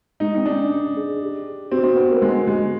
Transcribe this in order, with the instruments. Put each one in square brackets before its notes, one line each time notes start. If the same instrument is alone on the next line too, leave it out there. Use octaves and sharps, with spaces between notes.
[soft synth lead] G#3 [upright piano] D#4
[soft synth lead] C4 [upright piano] D#4
[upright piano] D4
[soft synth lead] C#4
G#4
G4
[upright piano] C4 [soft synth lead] F#4
[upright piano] C4
B3
A#3
G#3
G#3